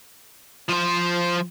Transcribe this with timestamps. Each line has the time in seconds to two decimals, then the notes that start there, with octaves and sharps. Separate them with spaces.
0.69 F3 C5